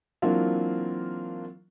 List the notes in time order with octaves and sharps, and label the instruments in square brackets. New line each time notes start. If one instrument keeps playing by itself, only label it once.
[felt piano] E3 F#3 A#3 C4 D4 F4